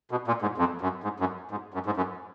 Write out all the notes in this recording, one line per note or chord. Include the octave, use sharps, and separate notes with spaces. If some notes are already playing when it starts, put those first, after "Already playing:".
B2
A#2
G#2
F2
F#2
G#2
F#2
G#2
F#2
G#2
F#2